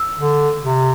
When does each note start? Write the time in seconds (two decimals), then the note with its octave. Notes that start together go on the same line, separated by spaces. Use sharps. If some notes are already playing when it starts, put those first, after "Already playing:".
Already playing: E6
0.19 D3
0.63 C3